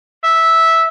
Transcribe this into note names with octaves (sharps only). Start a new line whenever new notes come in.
E5